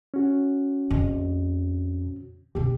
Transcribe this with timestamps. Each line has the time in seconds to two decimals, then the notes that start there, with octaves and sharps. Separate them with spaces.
0.14 C#4 F#4
0.91 A#1 F2
2.55 F#1 B1 G4